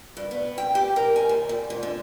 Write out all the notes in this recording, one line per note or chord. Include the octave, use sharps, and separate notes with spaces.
G2
B3
G5
G4
A#4
G#5
D#2
A#2
G#2
D3